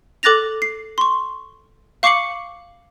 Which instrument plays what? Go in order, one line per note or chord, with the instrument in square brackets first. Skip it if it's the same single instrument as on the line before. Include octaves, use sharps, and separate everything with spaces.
[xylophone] A4 D6 F#6 A6 A#6 F7
C7
C6 C#6
F5 C#6 D6 C7 C#7 F#7